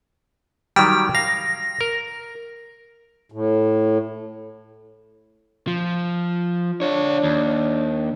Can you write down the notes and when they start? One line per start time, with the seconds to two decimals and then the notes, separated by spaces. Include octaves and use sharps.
0.76 D#3 F#3 G3 G5
1.15 F5 A#6
1.81 A#4
3.32 A2
5.67 F3
6.82 D4 F4 C#5
7.24 D#2